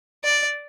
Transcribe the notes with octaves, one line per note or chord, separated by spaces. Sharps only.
D5